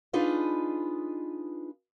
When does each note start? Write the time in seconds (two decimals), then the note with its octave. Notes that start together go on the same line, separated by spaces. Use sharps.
0.13 D4 D#4 F4 G#4 B4 D#5